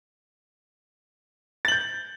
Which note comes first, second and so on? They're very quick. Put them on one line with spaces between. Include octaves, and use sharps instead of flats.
A6 F#7 G6